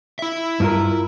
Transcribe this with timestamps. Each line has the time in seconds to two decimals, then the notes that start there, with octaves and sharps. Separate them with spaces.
0.19 E4 E5
0.60 G2 F4 A#4